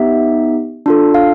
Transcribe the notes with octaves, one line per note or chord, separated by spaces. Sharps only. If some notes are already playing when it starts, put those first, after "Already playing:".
Already playing: B3 D#4 G4 E5
D4 F4 A4
F5